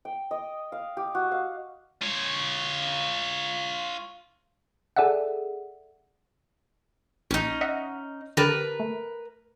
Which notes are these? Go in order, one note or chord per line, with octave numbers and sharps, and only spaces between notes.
G5
D#5
F5
G4
F#4
F5
F4 C#5
G#4 A4 D5 E5 F#5
A#1 C#4 D#4
D#5 E5 F#5
D3 G4 A#4 B4 A5
A3